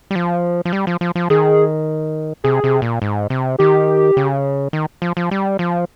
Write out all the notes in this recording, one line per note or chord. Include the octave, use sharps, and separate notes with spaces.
G3
F3
F3
G3
F3
F3
F3
D#3 G#4
C3 G#4
C3
A#2
G#2
C3
D#3 G4
C#3
D#3
F3
F3
G3
F3